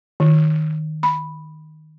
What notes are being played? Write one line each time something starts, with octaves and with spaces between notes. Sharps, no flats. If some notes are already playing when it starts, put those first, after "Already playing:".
D#3
B5